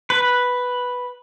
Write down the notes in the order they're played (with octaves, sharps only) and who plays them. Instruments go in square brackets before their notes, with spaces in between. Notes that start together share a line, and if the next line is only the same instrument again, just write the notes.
[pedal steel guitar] B4